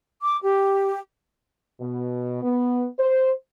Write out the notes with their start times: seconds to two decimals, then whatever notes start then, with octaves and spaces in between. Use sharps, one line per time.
0.22 D6
0.42 G4
1.80 B2
2.43 B3
2.99 C5